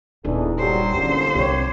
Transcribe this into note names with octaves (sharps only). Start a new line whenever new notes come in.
D#1 E2 D4 D#4 G#4 A4
G2 F#3 G3 C5
E2 A#2 D3 C#4
C2 C#3 G4 C#5